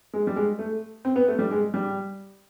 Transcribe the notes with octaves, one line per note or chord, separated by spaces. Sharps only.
G#3
G3
G#3
A3
C4
B3
A3
G3
G#3
G3